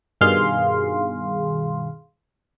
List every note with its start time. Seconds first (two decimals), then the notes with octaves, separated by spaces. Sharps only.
0.21 G2 B2 D#3 G#4 F5 C6